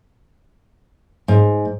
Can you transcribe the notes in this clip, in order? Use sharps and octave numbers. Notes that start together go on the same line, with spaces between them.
G#2